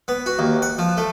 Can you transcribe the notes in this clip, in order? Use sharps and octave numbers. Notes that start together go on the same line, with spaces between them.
B3
F#4
D#2
F#5
F3
A3